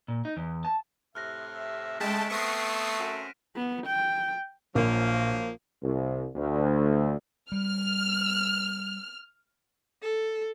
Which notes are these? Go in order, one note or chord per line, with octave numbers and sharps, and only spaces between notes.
A#2
D#4
E2
A5
A2 C3 E5 F6 F#6 A#6
E5
C#3 G#3 A3 G5 A5 B6 E7
A3 B3 C4 C#6 D#6 A#6 C7 D7
F#2 C4 D#7
B3
G5
A#1 F3 F#3 A#3
C2
D2
G3 F6
A4